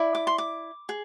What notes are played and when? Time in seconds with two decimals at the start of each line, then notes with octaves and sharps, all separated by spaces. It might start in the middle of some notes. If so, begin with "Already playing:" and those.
Already playing: E4 D5
0.15 D6
0.27 C6
0.38 D6
0.89 G#4